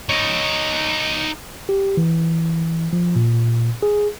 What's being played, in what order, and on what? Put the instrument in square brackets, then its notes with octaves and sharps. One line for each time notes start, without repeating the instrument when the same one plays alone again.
[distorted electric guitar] D#4 C#5
[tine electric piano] G4
E3
F3
A#2
G#4